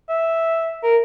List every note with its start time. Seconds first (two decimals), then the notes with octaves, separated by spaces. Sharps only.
0.09 E5
0.83 A#4